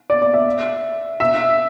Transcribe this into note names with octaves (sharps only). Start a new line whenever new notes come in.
D5
D5
E5
E5